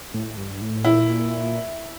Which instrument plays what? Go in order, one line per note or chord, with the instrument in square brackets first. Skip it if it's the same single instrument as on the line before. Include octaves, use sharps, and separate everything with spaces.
[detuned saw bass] A2
G2
A2
[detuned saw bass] A#2 [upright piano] E4